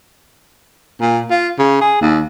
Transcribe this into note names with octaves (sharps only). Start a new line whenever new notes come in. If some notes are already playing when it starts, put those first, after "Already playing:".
A#2
F4
C#3
G#4
D#2